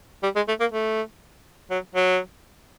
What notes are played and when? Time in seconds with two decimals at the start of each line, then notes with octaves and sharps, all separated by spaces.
0.23 G3
0.36 G#3
0.48 A3
0.60 A#3
0.72 A3
1.71 F#3
1.95 F#3